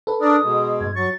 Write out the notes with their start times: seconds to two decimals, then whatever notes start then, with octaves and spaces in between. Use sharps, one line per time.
0.07 A4 B4
0.21 D4 A#4 D5 D#6
0.43 B2 G#3
0.81 G2 G#6
0.96 F#3 C#6 A6